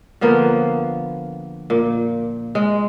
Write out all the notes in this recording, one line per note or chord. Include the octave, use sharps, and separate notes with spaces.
D3 F3 A#3 B3
A#2
G#3